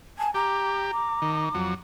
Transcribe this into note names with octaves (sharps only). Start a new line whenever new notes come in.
G#5 A5
G4 A#5 D6
D6
D#3
F2 F#3